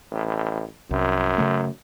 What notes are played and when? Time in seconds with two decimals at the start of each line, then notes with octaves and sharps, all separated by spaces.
0.11 A1
0.91 C2 F#2
1.38 C#3 A3